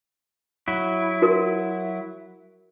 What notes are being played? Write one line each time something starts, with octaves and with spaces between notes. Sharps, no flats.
F#3 E4
F#4 A#4